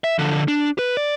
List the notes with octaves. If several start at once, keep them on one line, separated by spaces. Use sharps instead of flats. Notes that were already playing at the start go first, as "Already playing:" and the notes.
E5
D3 F3
D4
B4
D5